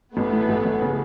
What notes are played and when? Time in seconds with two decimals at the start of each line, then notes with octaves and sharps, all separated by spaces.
0.16 A1 A3 B3
0.32 A2
0.49 A1
0.66 A1
0.82 C#3